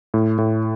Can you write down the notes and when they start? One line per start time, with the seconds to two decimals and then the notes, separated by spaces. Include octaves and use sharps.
0.14 A2
0.38 A2